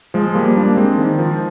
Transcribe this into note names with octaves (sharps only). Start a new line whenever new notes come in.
F3 G#3
G3 A#3
A#3 D4
G#3 C4
D#3
F3